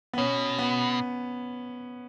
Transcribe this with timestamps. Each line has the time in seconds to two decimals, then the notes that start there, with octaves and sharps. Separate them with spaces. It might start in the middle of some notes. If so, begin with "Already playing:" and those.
0.13 B3
0.18 B2 C#4
0.59 B3